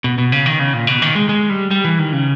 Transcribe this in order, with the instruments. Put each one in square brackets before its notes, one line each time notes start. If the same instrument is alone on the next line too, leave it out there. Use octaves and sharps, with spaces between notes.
[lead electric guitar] B2
B2
C#3
D#3
C#3
A#2
B2
D#3
G#3
G#3
G3
G3
E3
D#3
C#3